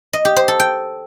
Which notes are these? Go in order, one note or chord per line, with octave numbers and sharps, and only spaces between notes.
D#5
G4
C5
A4
G5